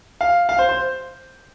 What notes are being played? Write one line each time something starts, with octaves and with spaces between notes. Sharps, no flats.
F5
F5
C5
C5